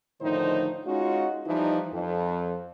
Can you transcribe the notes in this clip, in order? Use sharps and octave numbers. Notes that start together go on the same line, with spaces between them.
A2 D3 D#3 F3 D#4 C5
G#3 C#4 D#4 F4 F#4
E3 F3 G3 D#4
F2